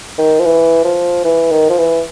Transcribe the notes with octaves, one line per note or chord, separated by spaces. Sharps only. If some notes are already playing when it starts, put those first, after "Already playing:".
D#3
F3
E3
F3
E3
D#3
F3
E3